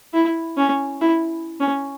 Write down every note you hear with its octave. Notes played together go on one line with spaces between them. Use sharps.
E4
C#4
E4
C#4